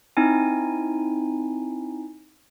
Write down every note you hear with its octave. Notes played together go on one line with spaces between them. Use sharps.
C4 D#4 E4 G#5